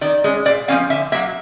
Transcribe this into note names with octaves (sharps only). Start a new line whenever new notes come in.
D#3 D5
G#3 C#4
A#2 D5
F3 A#3 C#4 F5
D3 E5
F#3 A#3 E5